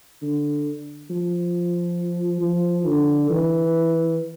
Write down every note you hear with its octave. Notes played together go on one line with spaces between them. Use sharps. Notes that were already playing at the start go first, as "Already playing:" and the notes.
D3
F3
F3
D3
E3